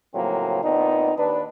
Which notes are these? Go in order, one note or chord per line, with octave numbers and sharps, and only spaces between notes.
A2 C#3 F3 F#3 A#3 C4
A#2 B3 C4 D4 D#4
D#2 D4 B4